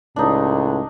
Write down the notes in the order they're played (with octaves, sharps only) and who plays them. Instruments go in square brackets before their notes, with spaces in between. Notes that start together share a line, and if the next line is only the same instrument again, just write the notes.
[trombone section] C#2 A2 [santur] D4 D#4